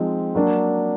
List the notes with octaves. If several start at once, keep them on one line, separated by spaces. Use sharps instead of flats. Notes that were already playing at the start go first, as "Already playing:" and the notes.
Already playing: F3 G#3 C4 D#4
F#3 A#3 D4 F#4